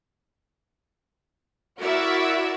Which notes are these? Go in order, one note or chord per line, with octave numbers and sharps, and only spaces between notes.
E4 F#4 A#4 D5 E5